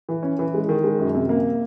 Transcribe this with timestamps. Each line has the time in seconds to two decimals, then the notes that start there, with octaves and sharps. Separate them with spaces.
0.09 E3
0.23 C#4
0.39 E3
0.54 G#3
0.69 D#3
0.83 G#3
0.99 F#2
1.15 C3
1.29 A#3